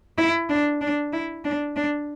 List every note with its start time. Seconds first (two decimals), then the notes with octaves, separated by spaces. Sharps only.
0.18 E4
0.50 D4
0.81 D4
1.13 E4
1.45 D4
1.76 D4